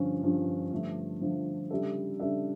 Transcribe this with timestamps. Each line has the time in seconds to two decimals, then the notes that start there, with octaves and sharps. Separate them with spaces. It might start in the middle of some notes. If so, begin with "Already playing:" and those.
Already playing: G2 D3 F3 C#4 F4
0.23 G2 D3 F3 C#4 F4
0.72 G2 D3 F3 A3
1.21 G2 D3 F3 A3
1.70 C#3 G3 D4 A4 E5
2.19 C#3 G3 D4 A4 E5